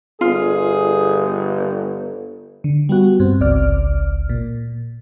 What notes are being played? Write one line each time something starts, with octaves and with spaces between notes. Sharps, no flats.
G1 F4 G#4
D3
G3 B3 F#4
G2 C4
G#1 C#2 D5 F6
A#2